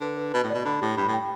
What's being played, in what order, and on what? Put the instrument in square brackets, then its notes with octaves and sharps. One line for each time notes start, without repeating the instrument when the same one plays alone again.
[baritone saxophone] D3 [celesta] B4
[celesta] B4
[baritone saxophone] B2 [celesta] B4
[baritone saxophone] A2
[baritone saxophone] B2 [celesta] D5
[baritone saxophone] D3 [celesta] B5
[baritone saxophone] A2 [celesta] G4
[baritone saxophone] G2 [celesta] B5
[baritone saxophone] A2
[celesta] G5